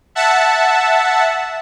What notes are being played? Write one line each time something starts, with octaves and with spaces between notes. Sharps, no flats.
E5 F#5 A5